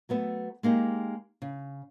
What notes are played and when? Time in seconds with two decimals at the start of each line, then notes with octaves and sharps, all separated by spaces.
0.09 F#3 A3 B3 E5
0.63 G#3 A#3 D#4 G4
1.42 C#3